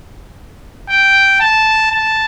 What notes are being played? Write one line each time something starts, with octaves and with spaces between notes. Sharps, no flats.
G5
A5
A5